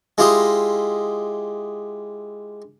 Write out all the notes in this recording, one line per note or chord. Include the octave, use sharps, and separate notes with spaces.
G#3 E4 F4 G4 D#5